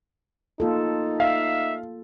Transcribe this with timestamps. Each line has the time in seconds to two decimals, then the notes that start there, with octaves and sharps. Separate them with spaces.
0.60 A#3 D#4 F4 A4
1.20 E5 F5